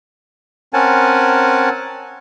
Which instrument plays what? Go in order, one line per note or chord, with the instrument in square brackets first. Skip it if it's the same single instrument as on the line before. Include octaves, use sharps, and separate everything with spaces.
[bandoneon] C4 C#4 A#4 F#5 G#5 A5